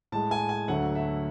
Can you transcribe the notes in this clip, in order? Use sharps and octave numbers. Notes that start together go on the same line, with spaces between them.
A2 G#3 A5
G#5
G#5
D2 D3 F#3 A3 F#5
E5